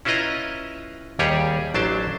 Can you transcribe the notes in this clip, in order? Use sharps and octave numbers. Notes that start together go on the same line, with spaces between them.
C#4 E4 F4 B4 D#5 A#5
D#2 G3 G4 G#4 C#5 D5
A1 F#3 D4 G4 C5 A5